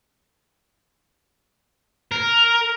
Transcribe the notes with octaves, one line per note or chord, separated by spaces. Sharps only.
A#4